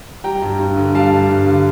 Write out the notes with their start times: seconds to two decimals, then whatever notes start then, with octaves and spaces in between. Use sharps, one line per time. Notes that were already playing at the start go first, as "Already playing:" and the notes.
0.24 G3 G5 A#5
0.42 G2
0.59 G2
0.77 D3
0.94 G3 F5 A5
1.12 G2
1.29 G2
1.47 D3